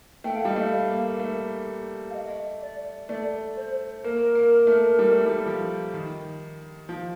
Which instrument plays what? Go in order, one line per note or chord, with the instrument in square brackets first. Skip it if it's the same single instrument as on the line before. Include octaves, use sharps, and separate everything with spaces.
[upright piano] A3 [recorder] G5
[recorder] F5
[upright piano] G3 [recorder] D#5
[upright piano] A3 [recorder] F5
[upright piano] A#3
A3
[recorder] F5
D#5
D5
[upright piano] A3 [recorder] D5
[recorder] C5
[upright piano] A#3 [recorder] A#4
[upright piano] A#3
A3
G3
A3
G3
F3
D#3
F3